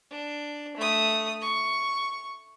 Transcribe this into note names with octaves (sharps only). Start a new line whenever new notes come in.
D4
A3 D#6
C#6